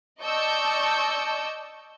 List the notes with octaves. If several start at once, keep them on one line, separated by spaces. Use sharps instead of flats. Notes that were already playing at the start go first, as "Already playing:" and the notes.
D5 D#5 A5 C#6 E6 G6